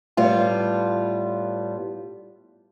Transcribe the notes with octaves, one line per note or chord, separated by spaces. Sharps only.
A2 G3 B3 F4